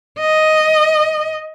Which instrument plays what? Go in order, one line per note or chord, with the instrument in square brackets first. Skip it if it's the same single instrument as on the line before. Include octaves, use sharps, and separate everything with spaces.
[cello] D#5